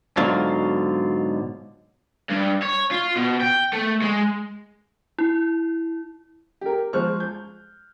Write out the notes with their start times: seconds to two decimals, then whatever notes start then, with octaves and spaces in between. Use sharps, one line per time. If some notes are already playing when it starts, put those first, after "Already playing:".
0.17 G#2 B2 D3 F#3 F4
2.29 G2
2.62 C#5
2.91 F4
3.16 B2
3.41 G5
3.73 A3
4.02 G#3
5.19 E4
6.61 G4 A#4
6.93 F3 G#3 C5 C#6 F6 F#6
7.20 G6